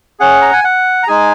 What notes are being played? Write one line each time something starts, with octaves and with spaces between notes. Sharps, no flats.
C#4 G#4 F#5
A#5
G#5
F#5
A#5
G#3 D#4 G#4 G#5